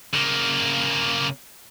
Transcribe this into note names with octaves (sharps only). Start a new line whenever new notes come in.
C#3 A#3